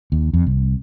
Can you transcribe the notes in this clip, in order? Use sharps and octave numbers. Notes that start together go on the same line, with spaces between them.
D#2
F2
C2